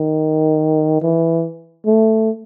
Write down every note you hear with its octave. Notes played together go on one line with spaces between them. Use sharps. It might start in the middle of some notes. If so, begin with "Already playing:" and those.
Already playing: D#3
E3
A3